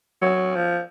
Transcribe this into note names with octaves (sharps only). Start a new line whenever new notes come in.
F#3
F3